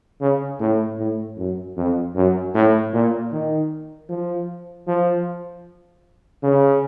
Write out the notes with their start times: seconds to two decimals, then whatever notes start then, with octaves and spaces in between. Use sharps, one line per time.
0.21 C#3
0.60 A2
0.99 A2
1.38 F#2
1.77 F2
2.15 F#2
2.55 A2
2.93 A#2
3.32 D#3
4.09 F3
4.87 F3
6.43 C#3